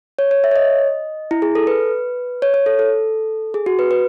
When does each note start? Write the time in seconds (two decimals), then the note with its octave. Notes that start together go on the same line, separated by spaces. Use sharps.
0.19 C#5
0.31 C#5
0.44 E5
0.51 C#5
0.56 D#5
1.31 E4
1.42 G#4
1.55 A4
1.67 B4
2.42 C#5
2.54 C#5
2.66 A4
2.79 A4
3.54 G#4
3.66 F#4
3.79 B4
3.91 B4